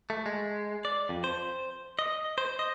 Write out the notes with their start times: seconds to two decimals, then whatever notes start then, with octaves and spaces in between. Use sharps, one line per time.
0.10 A3
0.26 G#3
0.85 D5
1.09 F2
1.24 C5
1.99 D#5
2.38 C5
2.59 D#5